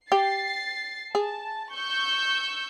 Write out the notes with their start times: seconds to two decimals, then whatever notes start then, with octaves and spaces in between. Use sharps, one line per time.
0.12 G4 A6 C7
1.15 G#4 A5
1.75 C#6 E6 G6